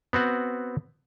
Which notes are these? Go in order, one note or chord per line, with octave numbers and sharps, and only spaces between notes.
B3 C4 F#4 F#5